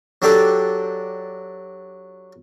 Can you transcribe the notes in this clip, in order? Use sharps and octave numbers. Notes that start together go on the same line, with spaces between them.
F#3 D4 G4 A4